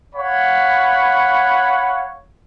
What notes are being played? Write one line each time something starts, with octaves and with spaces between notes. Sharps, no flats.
C#5 F5 F#5 B5